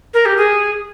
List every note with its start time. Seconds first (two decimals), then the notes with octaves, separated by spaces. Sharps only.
0.14 A#4
0.26 G4
0.37 G#4